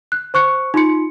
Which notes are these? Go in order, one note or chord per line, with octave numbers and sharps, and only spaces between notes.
F#6
C5 C#6 F#6 C#7
D#4 F4 C6 C#7